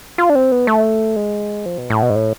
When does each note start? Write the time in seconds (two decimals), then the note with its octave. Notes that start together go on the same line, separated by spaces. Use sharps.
0.18 F4
0.29 D4
0.35 C4
0.52 B3
0.67 A3
1.16 G#3
1.66 F3
1.78 B2
1.90 A2
2.02 B2
2.10 G#2
2.16 A2